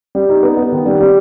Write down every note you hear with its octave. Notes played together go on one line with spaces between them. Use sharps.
G3
D#4
B3
B3
D#3
G3
G3